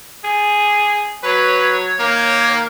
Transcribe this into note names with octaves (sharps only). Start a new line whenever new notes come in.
G#4
F#3 B4 C#5
D#3 A#3